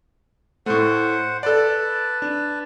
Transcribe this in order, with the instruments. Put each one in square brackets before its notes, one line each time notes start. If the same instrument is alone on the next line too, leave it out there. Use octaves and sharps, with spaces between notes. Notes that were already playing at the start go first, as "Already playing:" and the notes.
[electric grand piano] A2 A3 [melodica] C5 F#5
[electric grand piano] A4 D5 [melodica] B4 A5
[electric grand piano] D4